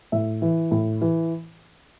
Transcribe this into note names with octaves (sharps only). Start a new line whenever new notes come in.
A2 E5
E3
A2
E3